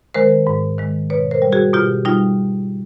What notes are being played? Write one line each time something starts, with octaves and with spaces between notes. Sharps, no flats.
D#3 G#3 A#4 C5
G#2
D#3 G#3
B2 B4 C#5
A#4 C5
G3
F#4 G#4
B2 F4 G4
G3 D#4 F4